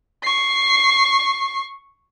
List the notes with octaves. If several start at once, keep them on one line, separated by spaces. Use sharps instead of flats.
C#6 C7